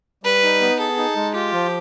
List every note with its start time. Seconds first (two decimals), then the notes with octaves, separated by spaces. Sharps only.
0.23 G3 B4
0.43 D#4
0.61 B3
0.79 G#4 A4
0.98 D#4
1.16 G#3
1.34 F4 G4
1.53 F3